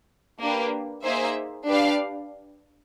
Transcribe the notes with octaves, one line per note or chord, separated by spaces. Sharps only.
A#3 D4 G4 B4
A#3 D#4 G#4 C5 E5
D4 G4 B4 D5 F5